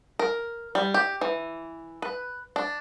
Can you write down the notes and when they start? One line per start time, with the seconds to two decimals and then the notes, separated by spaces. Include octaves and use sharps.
0.19 A#4
0.75 G3
0.94 G4
1.21 E3
2.02 B4
2.56 D4